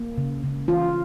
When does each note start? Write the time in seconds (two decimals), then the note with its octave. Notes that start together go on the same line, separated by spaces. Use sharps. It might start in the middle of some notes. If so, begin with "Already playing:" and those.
Already playing: A#3
0.18 C#3
0.44 C#3
0.68 E3 F4